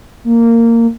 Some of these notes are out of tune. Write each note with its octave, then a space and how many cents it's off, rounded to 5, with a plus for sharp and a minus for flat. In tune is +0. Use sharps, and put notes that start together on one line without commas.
A#3 -15